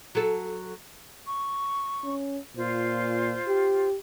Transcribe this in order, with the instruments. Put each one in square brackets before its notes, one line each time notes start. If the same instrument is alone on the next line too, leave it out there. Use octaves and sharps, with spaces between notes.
[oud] F#3 A4
[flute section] C#6
[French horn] C#4
[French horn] A#2 [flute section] F4 C5
[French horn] G4